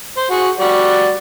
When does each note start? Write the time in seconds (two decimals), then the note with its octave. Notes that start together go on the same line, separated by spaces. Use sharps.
0.17 C5
0.31 F#4 G#4
0.59 G3 F#4 D5